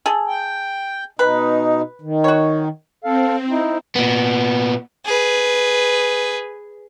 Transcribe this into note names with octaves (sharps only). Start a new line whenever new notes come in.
G#4 A4
G5
B2 D#4 B4
D#3
F#4 C#5
C4 A4 F5
D#4 E4
A#2 B3
G#4 B4